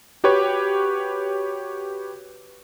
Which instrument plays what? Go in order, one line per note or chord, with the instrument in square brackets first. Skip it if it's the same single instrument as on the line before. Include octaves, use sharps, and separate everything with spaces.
[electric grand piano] F#4 G4 B4 C#5